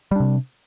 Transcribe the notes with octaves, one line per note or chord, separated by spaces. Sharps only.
C3 G3 D4